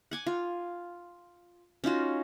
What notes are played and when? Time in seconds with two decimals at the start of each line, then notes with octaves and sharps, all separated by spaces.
0.11 F#5 G#5 D6
0.26 F4
1.84 C#4 D#4 F4 F#4